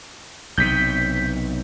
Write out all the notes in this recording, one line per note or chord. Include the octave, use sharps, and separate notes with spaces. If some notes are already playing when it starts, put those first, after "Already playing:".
B1 C3 G6 B6